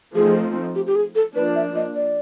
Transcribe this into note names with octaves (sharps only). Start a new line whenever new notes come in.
F3 A3 C4 D#4 G#4
G4
G4
G#4
A4
F3 A#3 D4 B4
E5
D#5
D5